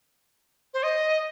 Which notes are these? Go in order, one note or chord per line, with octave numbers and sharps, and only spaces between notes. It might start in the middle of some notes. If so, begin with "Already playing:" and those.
C5
D#5